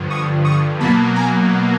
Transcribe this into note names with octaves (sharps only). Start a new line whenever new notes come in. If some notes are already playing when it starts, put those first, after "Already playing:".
Already playing: G2 D3 F3
C#6 D#6
C#6 D#6
B2 F#3 A#3 A5 B5
G#5 A#5